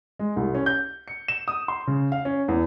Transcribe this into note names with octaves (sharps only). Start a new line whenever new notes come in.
G#3
C2
C#4
G6
C#7
E7
D#6
C6
C#3
F5
C#4
E2